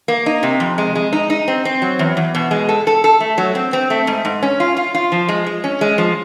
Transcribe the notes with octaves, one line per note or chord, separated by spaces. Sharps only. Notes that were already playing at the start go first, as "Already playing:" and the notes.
A#3
D#4
C3
F2
G#3
G#3
D#4
D#4
C4
C4
F#3
E2
E2
B2
G#3
A4
A4
A4
A3
F#3
C4
C4
A3
G#2
G#2
C#4
F4
F4
F4
F3
G#3
G#3
C#4
G#3
F3